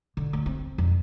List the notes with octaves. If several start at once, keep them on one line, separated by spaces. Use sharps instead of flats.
D3
D2
C4
F2